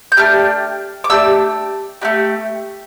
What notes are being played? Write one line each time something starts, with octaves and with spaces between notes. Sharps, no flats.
G6
A3 D4 G4 F6
D6
A3 D4 G4 E6
A3 D4 G4